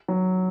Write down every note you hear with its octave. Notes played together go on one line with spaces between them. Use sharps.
F#3